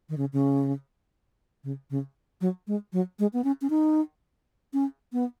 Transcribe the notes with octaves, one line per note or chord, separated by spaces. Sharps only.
D#3
C#3
C#3
C#3
C#3
F#3
G#3
F#3
G#3
B3
C#4
C#4
D#4
C#4
B3